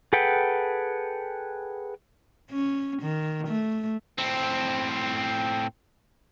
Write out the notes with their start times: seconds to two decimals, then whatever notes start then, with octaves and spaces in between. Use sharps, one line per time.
0.13 G#4 A4 B4 F#5 G5
2.50 C#4
3.02 D#3
3.48 A3
4.18 A2 C4